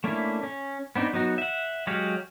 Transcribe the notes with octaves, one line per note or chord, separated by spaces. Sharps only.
A3 A#3 C#4 D4 E4
C#4
B3 C4 D4 D#4
F#3 B3 D#4 F#4
E5 F#5
F#3 G#3 F#4 G4 F5